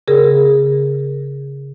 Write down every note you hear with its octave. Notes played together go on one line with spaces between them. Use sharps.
C#3 G#4 A#4